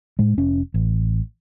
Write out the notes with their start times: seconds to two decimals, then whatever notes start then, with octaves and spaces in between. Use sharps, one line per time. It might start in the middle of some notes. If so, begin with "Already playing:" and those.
0.19 A2 G#3
0.37 F1 C#4
0.74 A1